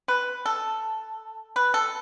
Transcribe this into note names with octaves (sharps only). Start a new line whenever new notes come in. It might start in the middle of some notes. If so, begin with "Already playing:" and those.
B4
A4
B4
A4